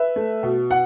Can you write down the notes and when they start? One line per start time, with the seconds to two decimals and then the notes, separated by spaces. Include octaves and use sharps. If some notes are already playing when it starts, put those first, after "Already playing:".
Already playing: B4 E5
0.16 A3
0.43 B2
0.71 F#5